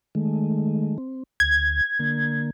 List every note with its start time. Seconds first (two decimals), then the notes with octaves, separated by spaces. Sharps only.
0.15 D#3 G#3 A3
0.98 C4
1.40 D2 G#6
1.99 D3 A#3